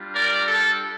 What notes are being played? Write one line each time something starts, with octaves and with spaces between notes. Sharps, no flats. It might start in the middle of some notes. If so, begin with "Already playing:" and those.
Already playing: G3 D4 F4
A#4 D5
A4